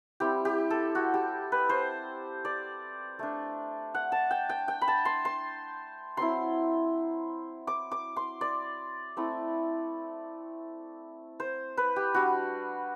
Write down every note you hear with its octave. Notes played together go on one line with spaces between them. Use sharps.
G3 C4 E4 G4
G4
A4
F#4
G4
B4
C5
D5
A3 D4
F#5
A5
G5
G5
G5
B5
A5
C6
C6
F#3 C4 E4 C6
D6
D6
C6
D5
A3 C4 E4
C5
B4
G4
G3 D4 F#4